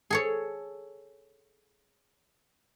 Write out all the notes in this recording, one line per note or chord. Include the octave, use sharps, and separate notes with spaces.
G#4 A4 C#5